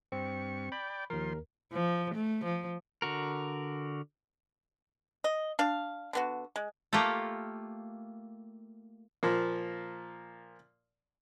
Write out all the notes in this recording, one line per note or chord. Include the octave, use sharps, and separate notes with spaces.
G2 C4 C#6
D5 G5 B5
B5
D#2 F3 A#4 C6
F3
A3
F3
D3 F#4 A#4
D#5
D4 F5
D3 B3 F#4
G#3
A3 A#3 F4 G4 A4
A#2 F3 A#3